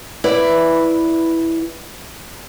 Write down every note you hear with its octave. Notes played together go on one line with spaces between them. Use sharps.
E4 B4 D5